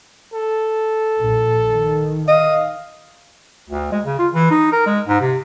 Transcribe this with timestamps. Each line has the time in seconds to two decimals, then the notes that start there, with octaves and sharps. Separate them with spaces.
0.33 A4
1.20 A#1
1.66 D#3
2.28 D#5 F5
3.69 D2
3.92 G#3
4.05 C#3
4.19 F4
4.33 E3
4.51 D#4
4.72 A#4
4.86 G#3
5.08 G#2
5.21 C3